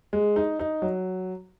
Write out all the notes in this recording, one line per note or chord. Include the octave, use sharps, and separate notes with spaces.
G#3
D#4
D#4
F#3